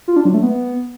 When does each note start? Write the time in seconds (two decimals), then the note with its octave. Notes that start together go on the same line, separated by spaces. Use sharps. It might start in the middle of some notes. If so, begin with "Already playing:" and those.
0.08 F4
0.16 D4
0.25 F#3
0.34 A3
0.43 B3